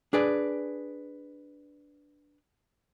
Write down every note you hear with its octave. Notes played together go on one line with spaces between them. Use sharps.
D4 G#4 B4 D5